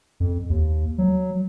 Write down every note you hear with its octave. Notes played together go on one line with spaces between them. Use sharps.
F2
D#2
F#3